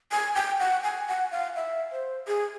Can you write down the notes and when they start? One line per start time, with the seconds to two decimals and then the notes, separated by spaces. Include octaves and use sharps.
0.12 G#5
0.35 G5
0.60 F#5
0.84 G#5
1.08 F#5
1.31 F5
1.56 E5
1.92 C5
2.28 G#4